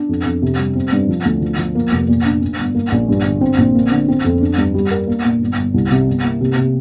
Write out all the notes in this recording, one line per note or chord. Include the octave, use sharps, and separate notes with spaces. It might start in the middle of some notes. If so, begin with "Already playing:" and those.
Already playing: D4
F2
F2
C3
G3
C4
G2
F3
D2
F3
F3
A#3
F1
A#2
D4
D4
G1
A#3
A#1
G2
D3
C4
A#1
A#3
D3
C4
F2
D4
G2
G3
A#4
A#3
A#2
G1
G1
C2
C3
G1
A#3
C3
C3